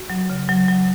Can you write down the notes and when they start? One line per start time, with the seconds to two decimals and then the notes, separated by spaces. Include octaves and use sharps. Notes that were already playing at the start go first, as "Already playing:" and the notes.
Already playing: F#4
0.10 F#3
0.30 C#3
0.49 F#3
0.68 F#3